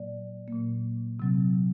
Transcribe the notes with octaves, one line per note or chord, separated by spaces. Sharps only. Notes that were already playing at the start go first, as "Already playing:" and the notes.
Already playing: A#2 F#3 A#3 D5
A#2 F#3 A#3
C3 F#3 C4